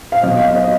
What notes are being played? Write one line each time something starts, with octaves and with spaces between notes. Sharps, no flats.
F5
B2 F#3 D#5
F5
D#5